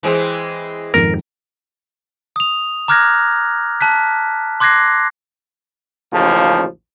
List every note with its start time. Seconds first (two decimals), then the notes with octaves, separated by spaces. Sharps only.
0.03 E3 G#3 C4
0.94 F2 G#2 D#3 A#4
2.36 D#6 F7
2.88 A#5 D6 F6 F#6 G#6 A#6
3.81 A5 F#6 B6
4.60 C6 D6 F#6 G#6 A#6 C7
6.12 A1 D#2 C#3 F3